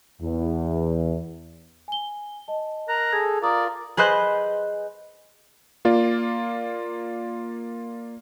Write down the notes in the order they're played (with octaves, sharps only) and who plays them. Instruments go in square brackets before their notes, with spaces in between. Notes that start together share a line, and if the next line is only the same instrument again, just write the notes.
[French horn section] E2
[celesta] G#5 G7
D#5 A5
[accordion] A#4 F#6 [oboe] A#5
[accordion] G#4 A4 [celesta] G#6
[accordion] F4 A#4 [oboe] D5 [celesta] A#5 D#6
[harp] G#4 B4 C5 D#5 F#6 G6
[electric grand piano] A#3 F4 D5